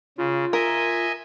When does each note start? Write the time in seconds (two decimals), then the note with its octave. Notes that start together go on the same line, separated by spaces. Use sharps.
0.18 C#3 F4
0.53 A#4 D#5 E5 G#5